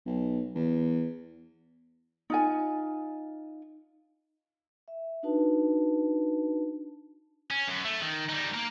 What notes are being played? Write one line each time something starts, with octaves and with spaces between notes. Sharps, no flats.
B1
E2
D#4 F4 G#5
E5
D4 D#4 F#4 B4 A5
C#4
F#2
A3
D#3
G3 D#4
A#3 A#4